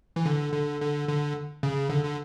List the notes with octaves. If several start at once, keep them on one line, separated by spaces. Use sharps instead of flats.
E3
D3
D3
D3
D3
C#3
D3
D3